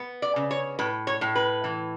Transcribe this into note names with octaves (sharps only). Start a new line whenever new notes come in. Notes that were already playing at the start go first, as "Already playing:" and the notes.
Already playing: B3
D5
C#3
C#5
A2 B4
C#5
A2
B4
E3